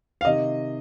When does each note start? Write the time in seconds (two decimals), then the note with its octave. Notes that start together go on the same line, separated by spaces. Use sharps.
0.21 F5
0.25 C3 D#3 D#5